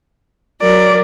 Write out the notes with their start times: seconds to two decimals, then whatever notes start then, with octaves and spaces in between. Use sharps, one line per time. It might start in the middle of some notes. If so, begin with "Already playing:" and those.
0.62 F#3 A#4 D5